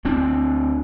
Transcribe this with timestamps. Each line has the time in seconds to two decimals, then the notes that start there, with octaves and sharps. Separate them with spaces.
0.05 D2 C4 D4